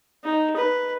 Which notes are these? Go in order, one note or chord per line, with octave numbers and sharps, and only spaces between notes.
D#4
B4